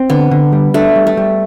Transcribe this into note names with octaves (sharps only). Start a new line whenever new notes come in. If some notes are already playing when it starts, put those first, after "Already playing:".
Already playing: C4
D3 B3
D3
G3
A3 D4
G3
A3
G3